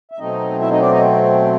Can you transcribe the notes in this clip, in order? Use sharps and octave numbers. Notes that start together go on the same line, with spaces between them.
E5
B2 F#3 A3 C4 D#4 D#5
E4 E5
D#4 D#5
D4 D5
D#4 D#5